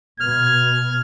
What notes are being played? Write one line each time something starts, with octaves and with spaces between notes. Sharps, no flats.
B2 F6 G#6